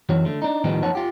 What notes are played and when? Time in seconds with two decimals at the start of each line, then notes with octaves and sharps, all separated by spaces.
0.09 F#2 E3 F#4 C#5
0.25 D3 A3
0.42 D4 D#4
0.64 A2 D#3 F3 G3 B3 D#4
0.82 F#2 F3 D#4 C#5 F#5 A5
0.95 F4 G4